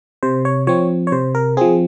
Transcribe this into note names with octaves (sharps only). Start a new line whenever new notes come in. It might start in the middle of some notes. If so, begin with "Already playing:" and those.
C3 C5
C#5
F3 C4 C#5
C#5
C3 C5
A#4
F3 C4 G#4